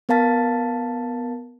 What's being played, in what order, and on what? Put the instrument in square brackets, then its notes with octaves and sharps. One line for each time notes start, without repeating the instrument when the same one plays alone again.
[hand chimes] B3 A#4 F5 A5 A6 B6